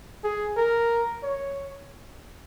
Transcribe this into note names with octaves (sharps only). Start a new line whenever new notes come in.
G#4
A#4
C#5